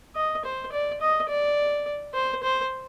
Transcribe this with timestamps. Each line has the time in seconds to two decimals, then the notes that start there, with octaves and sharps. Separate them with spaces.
0.16 D#5
0.45 C5
0.72 D5
1.01 D#5
1.29 D5
2.14 C5
2.43 C5